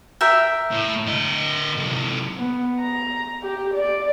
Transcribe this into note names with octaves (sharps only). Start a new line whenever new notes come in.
A#4 E5 G5
A2
D3 D#5
C3 F#3
B3
A#5
G4
D5